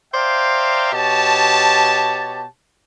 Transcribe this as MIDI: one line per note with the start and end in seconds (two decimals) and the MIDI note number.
0.14 0.89 72
0.14 0.89 74
0.14 0.89 76
0.14 0.89 77
0.14 0.89 79
0.14 0.89 82
0.93 2.44 47
0.93 2.44 67
0.93 2.44 73
0.93 2.44 81